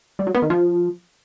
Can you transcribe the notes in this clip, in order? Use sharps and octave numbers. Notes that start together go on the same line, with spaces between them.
G3
F#3
B3
D#3
F3